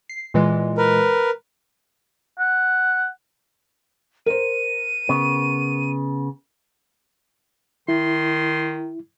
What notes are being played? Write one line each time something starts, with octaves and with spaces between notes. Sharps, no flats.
C7
A#2 E3 G#3
A#4 B4
F#5
A#4 C5 D#7
C#3 B3
D#3 E4 C6